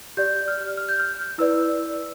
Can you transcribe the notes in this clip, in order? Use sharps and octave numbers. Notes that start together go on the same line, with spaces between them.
G4 D5 G6
F6
F6
G6
F6
E4 B4 D5 E6